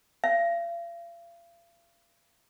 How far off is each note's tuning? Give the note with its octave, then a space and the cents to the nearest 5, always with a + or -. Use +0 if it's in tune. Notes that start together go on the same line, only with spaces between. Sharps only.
F5 -40